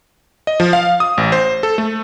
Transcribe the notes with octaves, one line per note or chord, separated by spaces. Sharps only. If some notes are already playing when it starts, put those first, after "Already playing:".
D#5
F3
F5
D#6
A1
C5
A4
A3